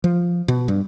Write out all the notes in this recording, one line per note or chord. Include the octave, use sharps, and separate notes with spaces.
F3
B2
G2